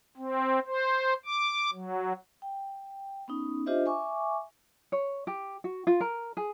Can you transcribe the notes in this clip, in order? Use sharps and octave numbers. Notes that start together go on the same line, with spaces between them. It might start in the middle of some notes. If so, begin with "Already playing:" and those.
C4
C5
D6
F#3
G5
B3 C#4 D#4
D4 F4 G4 C5 D#5 E5
E5 G#5 C#6 D6
C#5
G4
F#4
F4
A#4
G#4